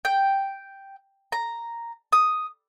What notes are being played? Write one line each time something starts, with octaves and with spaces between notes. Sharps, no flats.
G5
A#5
D#6